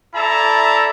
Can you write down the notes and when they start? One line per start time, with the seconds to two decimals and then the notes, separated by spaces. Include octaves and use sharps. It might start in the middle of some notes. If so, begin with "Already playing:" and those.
0.15 E4 A4 D5 E5 A5 A#5